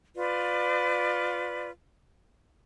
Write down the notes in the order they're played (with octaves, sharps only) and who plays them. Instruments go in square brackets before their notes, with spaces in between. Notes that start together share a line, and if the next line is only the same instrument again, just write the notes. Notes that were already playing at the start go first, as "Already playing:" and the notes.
[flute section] F4 B4 D5